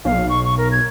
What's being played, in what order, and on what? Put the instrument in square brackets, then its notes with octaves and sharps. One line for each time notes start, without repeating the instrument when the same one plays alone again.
[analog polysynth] B1 [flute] F5
[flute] C#6
C#6
A#4
G#6